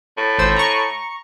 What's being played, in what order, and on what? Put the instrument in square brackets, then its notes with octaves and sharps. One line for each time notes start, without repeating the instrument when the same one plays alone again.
[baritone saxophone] A2
[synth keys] G#1 C5 E6
A#5 C#6